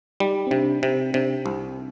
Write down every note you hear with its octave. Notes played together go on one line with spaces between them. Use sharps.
G3 D#4
C4
C3 D4
C3 C4
C3 D4
C2